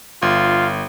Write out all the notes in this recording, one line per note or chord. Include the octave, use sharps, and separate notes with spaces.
G1 F4